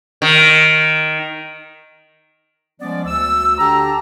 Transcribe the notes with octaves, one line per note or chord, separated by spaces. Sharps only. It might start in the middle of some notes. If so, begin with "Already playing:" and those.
D#3
F3 G3 G#3 B3 C#4 D5
D2 E6
D3 D4 G4 A5 A#5